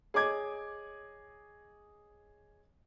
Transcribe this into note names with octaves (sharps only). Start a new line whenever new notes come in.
G#4 C#5 D#5 D6 G#6